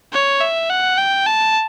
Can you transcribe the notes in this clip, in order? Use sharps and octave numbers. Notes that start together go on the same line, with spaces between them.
C#5
E5
F#5
G5
A5